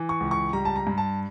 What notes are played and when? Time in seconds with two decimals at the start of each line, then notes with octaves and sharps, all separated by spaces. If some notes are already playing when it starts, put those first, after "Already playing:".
Already playing: E3
0.09 C#6
0.20 C#2
0.31 C#6
0.53 G3 A#5
0.65 A5
0.76 A#5
0.87 G2
0.98 A5